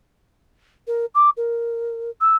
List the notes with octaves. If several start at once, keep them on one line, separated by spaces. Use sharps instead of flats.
A#4
D6
A#4
E6